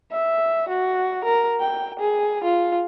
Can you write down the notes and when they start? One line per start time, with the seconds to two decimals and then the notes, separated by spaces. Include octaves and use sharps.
0.12 E5
0.69 F#4
1.25 A#4
1.60 G5
2.00 G#4
2.44 F4